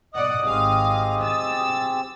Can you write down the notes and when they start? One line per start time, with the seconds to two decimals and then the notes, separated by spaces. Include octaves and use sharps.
0.14 D5 D#5 F#5 D#6
0.46 G#1 C4 G4 G#4 F5
1.23 E6 A6